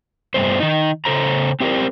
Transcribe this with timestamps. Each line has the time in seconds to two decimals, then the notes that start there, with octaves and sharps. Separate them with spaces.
0.34 G2 G3 A3 B3 C5
0.60 D#3 D#4
1.05 C#3 A4 C5 A#5
1.60 C4 G4 A4 A#4 C5